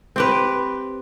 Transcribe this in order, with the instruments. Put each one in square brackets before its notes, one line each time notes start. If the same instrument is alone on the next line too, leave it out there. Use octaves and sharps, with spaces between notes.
[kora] C4 G4 B4